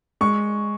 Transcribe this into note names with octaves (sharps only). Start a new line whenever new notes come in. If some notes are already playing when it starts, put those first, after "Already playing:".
G#3 C#6